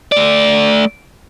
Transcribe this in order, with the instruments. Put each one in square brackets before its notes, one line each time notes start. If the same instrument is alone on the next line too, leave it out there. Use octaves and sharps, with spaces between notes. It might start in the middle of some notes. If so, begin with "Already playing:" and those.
[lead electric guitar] A3 D5